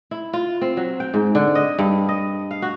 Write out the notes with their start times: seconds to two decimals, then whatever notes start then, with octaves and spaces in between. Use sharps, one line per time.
0.11 E4
0.33 F4
0.61 C4
0.77 F#3
1.00 G5
1.14 G#2
1.35 D3
1.55 D#5
1.79 G2
2.09 D#5
2.51 F5
2.62 F#4